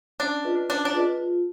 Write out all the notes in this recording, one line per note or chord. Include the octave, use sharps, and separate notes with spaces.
C#4 D4
F4 G#4 B4 D#5
C#4 D4
D4
F4 G#4 B4 D#5
F4